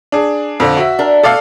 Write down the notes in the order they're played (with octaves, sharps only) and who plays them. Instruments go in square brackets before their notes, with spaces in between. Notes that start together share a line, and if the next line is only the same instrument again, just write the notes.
[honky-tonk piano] D4 G#4
F2 D3
F#4 E5
[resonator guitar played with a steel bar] D4 A#4
[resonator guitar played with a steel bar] B2 A3 [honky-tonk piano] A4 D5 F5